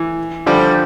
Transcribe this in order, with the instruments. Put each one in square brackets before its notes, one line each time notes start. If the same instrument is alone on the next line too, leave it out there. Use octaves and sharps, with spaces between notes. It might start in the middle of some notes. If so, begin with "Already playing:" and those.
Already playing: [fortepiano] E3
[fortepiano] D3 F3 [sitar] G3